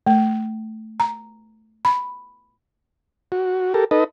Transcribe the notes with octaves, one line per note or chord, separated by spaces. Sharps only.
A3
A#5
B5
F#4
G4 A4 A#4
D#4 A4 B4 D#5